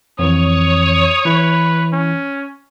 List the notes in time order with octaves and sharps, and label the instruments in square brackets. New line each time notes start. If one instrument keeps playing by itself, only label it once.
[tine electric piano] F2 E3 [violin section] C#5 [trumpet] D#6
[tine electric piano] E3 E4 [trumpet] B4
[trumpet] C#4